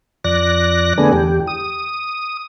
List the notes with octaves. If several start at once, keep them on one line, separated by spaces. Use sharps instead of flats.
F2 D5 F#6 A#6
D3 A3 B3 D4 G#4
E2 G4
D#6